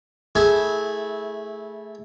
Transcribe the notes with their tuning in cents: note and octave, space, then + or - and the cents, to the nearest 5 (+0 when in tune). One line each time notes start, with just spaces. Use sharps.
A3 +0 E4 -20 G#4 +0